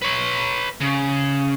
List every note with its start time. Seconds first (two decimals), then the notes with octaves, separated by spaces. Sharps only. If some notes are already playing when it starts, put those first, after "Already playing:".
0.02 B4 C#5
0.81 C#3